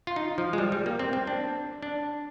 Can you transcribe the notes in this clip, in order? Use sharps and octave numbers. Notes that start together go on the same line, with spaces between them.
F4
D#4
F3
G#3
G3
G3
A#3
C4
C4
D4
D4